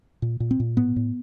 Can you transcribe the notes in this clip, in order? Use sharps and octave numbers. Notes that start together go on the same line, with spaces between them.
A#2
A#2
C4
A#2
A2 B3
A2